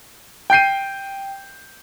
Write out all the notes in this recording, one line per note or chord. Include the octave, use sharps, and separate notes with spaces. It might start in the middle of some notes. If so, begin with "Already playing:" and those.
G5 G6 C7 D#7